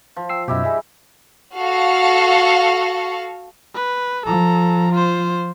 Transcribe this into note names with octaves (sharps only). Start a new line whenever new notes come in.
F3
G5 E6 C7
F#2 B2 D#4 E4 G4
G3 G#4 E5
F#4 A4 F5
B4
F3 A4 A#5
F4 C5